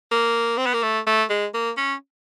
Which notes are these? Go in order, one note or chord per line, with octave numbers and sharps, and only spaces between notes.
A#3
C4
B3
A#3
A3
A3
G#3
A#3
C#4